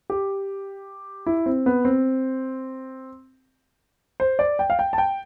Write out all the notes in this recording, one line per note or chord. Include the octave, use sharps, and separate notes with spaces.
G4
E4
C4
B3
C4
C5
D5
G5
F5
G5
A5
G5